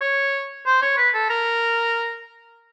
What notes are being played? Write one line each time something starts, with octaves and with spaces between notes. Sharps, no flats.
C#5
C5
C#5
B4
A4
A#4